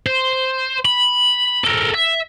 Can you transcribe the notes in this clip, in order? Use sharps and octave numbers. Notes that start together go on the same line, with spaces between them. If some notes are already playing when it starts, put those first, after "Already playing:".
C5
B5
A4 A#4
E5